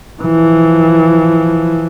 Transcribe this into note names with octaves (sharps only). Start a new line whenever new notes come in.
E3 F3